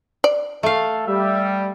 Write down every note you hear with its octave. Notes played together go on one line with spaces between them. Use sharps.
D5
A3 A4 F5
G3 E5